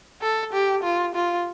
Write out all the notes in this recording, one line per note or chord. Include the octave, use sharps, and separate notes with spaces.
A4
G4
F4
F4